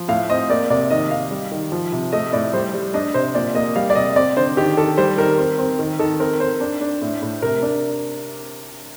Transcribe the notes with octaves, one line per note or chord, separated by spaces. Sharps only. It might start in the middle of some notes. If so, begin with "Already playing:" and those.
Already playing: F3
A2 F5
C4 D#5
A#3 D5
C3 D5
D#3 D#5
D#3 F5
G3
D#3
F3
C3
A3 D#5
A2 D5
G3 C5
G3
D4 D#5
C3 C5
A#2 D5
A#3 D#5
G3 F5
D5
C3 D#5
C4 D5
D3 C5
D#3 G4
D#3 A4
G3 C5
D#3 A#4
C4
C4
D#3
D#3 A4
C4 A#4
C4 C5
D4
D4
A2
A2
C3 A#4
D4